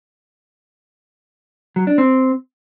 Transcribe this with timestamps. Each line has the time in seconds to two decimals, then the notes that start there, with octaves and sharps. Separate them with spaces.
1.76 F#3
1.87 D4
1.98 C4